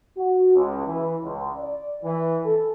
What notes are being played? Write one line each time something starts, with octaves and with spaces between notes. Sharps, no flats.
F#4
C#2
E3
C#2
D5
E3
A4